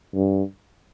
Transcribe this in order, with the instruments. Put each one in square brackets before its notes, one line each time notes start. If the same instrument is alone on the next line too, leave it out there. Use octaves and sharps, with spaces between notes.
[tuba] G2